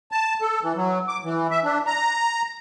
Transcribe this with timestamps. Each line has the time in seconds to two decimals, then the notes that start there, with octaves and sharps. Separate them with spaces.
0.12 A5
0.41 A4
0.63 E3
0.76 F#3
1.08 D6
1.24 E3
1.51 E5
1.64 D4
1.87 A#5